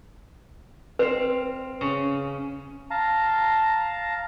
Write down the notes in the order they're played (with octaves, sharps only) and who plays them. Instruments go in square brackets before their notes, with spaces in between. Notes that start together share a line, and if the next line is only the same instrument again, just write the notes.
[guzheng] C4 F5 [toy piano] B4
[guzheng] C#3 C#4
[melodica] F5 A5 A#5